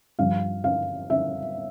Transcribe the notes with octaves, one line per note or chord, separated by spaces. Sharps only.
G2 F3 F5
F5
E5